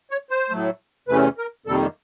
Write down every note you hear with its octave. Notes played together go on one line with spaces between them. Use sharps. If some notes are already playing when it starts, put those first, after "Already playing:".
C#5
C5
A2 F#3 A3
E2 C3 E3 A3 C#4 B4
A#4
F2 C3 D#3 G3 A#3 A4